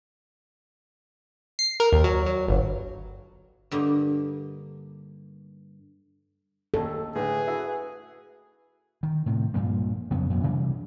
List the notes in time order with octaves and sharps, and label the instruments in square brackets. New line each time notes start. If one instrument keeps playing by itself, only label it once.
[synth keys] C7
A#4
D#2
F#3
F#3
G1
[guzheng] G2 D3 A#3 D#4
[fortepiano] D#2 C#4 [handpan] A4
[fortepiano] A2 D3 [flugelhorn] G#4 [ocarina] B4
[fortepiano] E4 F#4 E5
[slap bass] D#3
A2 C3
G2 A#2 F3 A#3
F2 C#3 F#3 B3
F2 A#2
C3 E3 G3 D4